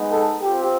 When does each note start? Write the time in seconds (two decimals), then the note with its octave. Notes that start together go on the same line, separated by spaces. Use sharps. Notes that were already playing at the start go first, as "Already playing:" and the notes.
Already playing: G#3 B3 D#4
0.10 A4
0.41 C4 F4 G4